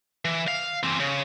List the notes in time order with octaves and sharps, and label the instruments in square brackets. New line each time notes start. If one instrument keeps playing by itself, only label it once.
[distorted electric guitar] E3
F5
E3 C4
C#3